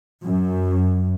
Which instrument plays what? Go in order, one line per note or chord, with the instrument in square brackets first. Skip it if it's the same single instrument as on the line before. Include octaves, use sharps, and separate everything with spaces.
[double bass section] F#2